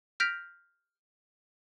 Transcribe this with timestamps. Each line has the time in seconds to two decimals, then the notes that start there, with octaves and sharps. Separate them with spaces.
0.20 F6 G6 A#6 B6 D7 F7